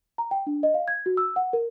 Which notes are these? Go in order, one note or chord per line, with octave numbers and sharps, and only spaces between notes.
A#5
G5
D4
D#5
F5
G#6
F#4
E6
F#5
A#4